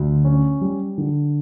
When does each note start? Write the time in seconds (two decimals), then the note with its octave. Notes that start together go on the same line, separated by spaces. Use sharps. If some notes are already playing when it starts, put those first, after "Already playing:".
Already playing: D2
0.25 C#4
0.61 G3
0.98 D3